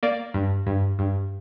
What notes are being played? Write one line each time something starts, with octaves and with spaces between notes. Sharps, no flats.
A#3 D5
G2
G2
G2